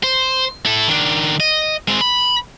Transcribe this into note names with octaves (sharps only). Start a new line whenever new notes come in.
C5
E4 A4
D#3 D4
D#5
G#3 C4
B5